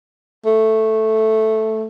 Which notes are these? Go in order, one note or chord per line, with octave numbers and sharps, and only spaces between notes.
A3